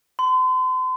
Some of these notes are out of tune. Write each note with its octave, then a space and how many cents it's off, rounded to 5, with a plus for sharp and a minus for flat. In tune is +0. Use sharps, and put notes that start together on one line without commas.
C6 -40